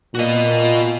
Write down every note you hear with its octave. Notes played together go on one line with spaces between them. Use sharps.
A#2 F#4 D#5